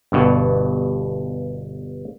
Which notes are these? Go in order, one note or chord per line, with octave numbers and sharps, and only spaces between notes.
G1 G2 B2